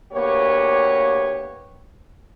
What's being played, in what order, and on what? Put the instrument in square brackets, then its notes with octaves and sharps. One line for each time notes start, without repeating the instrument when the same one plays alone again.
[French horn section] D2 A#3 B3 G4 C#5